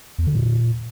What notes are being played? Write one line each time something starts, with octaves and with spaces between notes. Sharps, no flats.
E2
D3
A#2